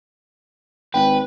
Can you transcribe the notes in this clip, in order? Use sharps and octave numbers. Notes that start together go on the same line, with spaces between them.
G#1 B4 G5